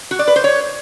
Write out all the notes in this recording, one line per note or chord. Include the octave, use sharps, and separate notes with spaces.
F#4
D5
B4
C5
C#5